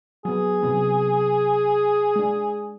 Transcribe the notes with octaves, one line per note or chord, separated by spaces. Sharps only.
F#3 B3 G#4
C3 F#3 B3
G#3 D4